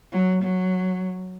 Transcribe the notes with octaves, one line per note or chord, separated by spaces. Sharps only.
F#3
F#3